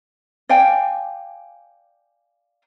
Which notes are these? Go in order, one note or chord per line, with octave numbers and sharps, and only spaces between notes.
D5 F5 G5 G#5